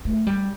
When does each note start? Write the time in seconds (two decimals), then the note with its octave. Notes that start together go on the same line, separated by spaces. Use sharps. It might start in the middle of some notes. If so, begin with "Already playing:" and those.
0.05 A3
0.27 G3